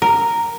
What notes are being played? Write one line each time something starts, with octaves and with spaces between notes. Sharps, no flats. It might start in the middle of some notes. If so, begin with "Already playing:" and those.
A#4